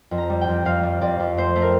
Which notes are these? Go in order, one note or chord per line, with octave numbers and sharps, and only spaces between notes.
F2
A#5
G3
G5
F2
F2 F5
G3
F2 D5
F2
A3 C5
A3
A#4